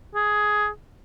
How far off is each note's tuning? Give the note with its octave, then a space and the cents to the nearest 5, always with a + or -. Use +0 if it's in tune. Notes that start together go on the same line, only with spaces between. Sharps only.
G#4 +10